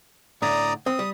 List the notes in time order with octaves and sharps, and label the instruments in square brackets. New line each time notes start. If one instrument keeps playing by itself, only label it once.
[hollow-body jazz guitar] A2 D3 [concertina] D5 A#5 D#6
[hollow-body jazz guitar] C4 [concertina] D#6
[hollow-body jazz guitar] G3